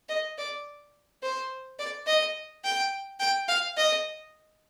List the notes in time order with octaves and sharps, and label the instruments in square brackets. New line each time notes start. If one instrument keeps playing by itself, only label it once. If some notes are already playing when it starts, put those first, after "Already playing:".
[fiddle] D#5
D5
C5
D5
D#5
G5
G5
F5
D#5